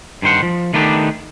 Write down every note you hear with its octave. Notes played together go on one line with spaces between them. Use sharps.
G2 D#3 C5 F#5
F3
D#3 A3 B3 D4 D#4 G4